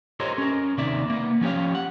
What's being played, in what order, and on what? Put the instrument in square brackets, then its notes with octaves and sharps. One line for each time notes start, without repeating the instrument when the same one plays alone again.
[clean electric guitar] G4 A4 A#4 C5 C#5 D#5
C#4 A#4
D#2 C3 D#3 A#3 D5 E5
A#3 B3
F3 C#4 G4 C#5 F5
F#5